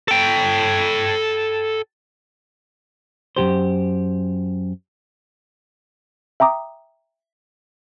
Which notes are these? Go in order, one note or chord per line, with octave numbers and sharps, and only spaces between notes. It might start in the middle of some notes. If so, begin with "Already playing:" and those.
A4 G5
F#2 A#2 G4 C5
E5 G5 A#5 D6 D#6